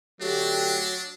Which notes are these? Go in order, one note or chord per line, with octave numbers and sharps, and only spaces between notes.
D3 F#3 A3 D4 G4